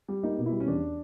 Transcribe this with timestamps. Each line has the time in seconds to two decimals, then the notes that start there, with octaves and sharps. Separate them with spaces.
0.08 G3
0.23 A#3 D#4
0.38 B2
0.46 E4
0.52 G3
0.60 C#4
0.67 E2 D4